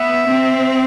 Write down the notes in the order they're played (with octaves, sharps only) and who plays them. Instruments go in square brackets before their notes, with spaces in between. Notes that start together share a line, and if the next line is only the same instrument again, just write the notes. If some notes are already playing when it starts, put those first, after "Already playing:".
Already playing: [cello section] B3 [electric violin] E5
[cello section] C4